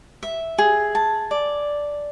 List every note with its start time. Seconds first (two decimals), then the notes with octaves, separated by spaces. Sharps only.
0.23 E5
0.58 G#4
0.95 A5
1.31 D5